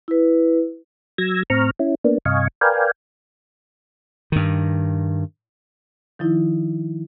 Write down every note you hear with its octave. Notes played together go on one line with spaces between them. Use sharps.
E4 B4
F#3 E6 G#6 A#6
A2 C4 A#5 C#6 F6
C#4 E4
A#3 B3 D4
G2 C3 D#5 F5 G#5 C#6
A#4 B4 D5 F5 G5 G#5
G2 D#3
D#3 F3 D#4 E4